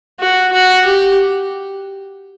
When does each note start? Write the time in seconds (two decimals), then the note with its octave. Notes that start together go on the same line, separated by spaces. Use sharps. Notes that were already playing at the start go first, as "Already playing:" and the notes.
0.20 F#4
0.52 F#4
0.85 G4